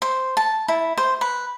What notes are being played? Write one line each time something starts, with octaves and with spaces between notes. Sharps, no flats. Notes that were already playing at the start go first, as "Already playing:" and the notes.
C5
A5
E4
C5
B4